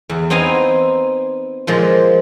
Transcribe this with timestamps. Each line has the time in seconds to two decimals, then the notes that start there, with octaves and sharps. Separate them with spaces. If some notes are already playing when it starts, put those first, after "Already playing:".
0.09 E2
0.30 B3 C4 D#4 F5 G#5
1.67 A#2 F3 G#3